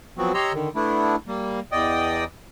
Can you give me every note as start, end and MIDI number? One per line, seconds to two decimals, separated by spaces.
0.18 0.32 53
0.18 0.32 54
0.18 0.32 59
0.18 0.32 60
0.18 0.32 66
0.34 0.53 67
0.34 0.53 73
0.34 0.53 75
0.34 0.53 82
0.34 0.53 84
0.34 0.53 88
0.53 0.69 50
0.53 0.69 51
0.76 1.16 57
0.76 1.16 59
0.76 1.16 62
0.76 1.16 64
1.28 1.60 55
1.28 1.60 58
1.72 2.24 40
1.72 2.24 74
1.72 2.24 75
1.72 2.24 79
1.72 2.24 87